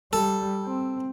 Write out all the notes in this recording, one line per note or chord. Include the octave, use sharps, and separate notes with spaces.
G3 A4
C4